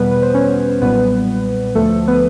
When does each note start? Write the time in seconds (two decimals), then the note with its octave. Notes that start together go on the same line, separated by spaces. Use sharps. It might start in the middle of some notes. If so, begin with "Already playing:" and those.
Already playing: E2 B2 G3 B3 B4
0.11 B4
0.22 C5
0.34 C#4 C#5
0.81 B1 A#2 G3 B3 B4
1.75 D2 D3 F3 A3 A4
2.08 B3 B4